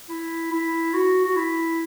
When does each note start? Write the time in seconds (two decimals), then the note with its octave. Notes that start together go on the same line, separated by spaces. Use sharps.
0.09 E4
0.51 E4
0.93 F#4
1.25 F#4
1.36 E4